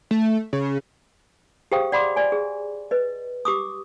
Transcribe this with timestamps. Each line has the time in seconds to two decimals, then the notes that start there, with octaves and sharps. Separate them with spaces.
0.11 A3
0.53 C#3
1.72 G4 G#4 C5 F5 G5 D#6
1.92 D5 F#5 B5 C6 D6
2.16 D5 G#5
2.32 G#4
2.91 B4 D#5
3.45 G4 D6 D#6